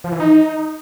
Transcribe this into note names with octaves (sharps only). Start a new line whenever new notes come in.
F3
E3
D#4